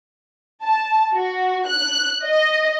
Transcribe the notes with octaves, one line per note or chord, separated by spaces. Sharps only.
A5
F#4
F#6
D#5